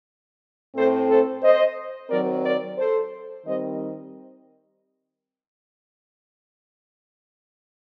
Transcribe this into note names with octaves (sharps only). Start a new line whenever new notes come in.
A2 A3 C4 A4 C5
A4 C5
C5 D#5
D#3 F#3 C4 A#4 D5
A#4 D5
A4 C5
D#3 G3 C4 C5 D#5